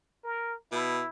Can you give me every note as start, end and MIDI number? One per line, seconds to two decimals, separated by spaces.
0.24 0.54 70
0.72 1.02 47
0.72 1.09 64